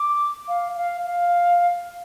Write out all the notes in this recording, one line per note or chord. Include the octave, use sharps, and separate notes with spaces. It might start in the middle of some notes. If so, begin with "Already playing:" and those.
Already playing: D6
F5
F5
F5